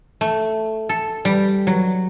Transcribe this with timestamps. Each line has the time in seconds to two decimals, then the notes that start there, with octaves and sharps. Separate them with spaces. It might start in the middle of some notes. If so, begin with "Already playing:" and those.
0.21 A3
0.89 A4
1.25 G3
1.67 F#3